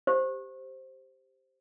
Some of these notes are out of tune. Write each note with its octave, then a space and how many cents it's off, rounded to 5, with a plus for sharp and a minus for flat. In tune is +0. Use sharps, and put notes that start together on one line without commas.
G4 +0 C5 +0